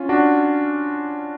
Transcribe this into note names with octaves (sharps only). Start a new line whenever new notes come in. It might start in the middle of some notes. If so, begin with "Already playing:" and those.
Already playing: C#4 F4
D4 F#4